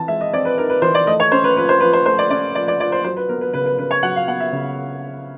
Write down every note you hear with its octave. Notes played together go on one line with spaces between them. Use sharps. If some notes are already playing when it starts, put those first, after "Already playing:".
Already playing: E3 C4 A5
G#3 E5
D#5
C4 D5
B4
D#4 A#4
B4
E3 C5
D5
A3 D#5
C#5
C#4 C5
B4
F3 B4
C5
F3 B4
C5
A3 C5
D5
C#4 D5
F3 D5
D5
F3 D5
C5
F#3 C5
B4
B3 A#4
B4
C#3 B4
B4
C#3 B4
C#5
F#3 F#5
F5
B3 F#5
E5
C#3